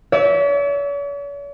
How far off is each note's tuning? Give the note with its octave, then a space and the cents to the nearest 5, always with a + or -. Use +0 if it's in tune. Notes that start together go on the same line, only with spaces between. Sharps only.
C#5 +45 E5 -15